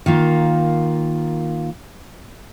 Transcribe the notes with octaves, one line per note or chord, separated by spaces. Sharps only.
D#3 A#3 F4